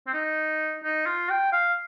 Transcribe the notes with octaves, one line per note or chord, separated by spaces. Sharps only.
C4
D#4
D#4
F4
G5
F5